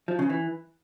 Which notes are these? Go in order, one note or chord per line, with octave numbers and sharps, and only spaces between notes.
F3
C#3
E3